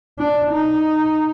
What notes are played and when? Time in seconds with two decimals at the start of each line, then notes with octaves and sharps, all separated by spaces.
0.19 D4
0.51 D#4